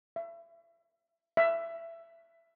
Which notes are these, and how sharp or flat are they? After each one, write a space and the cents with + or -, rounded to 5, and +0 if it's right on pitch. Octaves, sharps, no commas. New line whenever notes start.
E5 +35
E5 +20